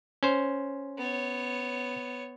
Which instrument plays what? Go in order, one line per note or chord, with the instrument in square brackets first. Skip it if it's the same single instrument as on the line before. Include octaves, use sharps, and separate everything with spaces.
[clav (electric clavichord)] C#4 C5
[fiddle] B3 C#5